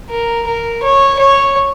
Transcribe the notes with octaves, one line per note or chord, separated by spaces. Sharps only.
A#4
A#4
C#5
C#5